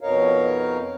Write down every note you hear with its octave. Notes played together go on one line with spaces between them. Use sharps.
F2 B2 D#4 A#4 C#5 F5